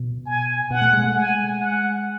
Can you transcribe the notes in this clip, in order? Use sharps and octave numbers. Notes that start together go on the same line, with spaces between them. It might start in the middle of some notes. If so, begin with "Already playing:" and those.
Already playing: B2
G#5
B2 F#5
A3
G#3
A3
G#3 G#5
F#5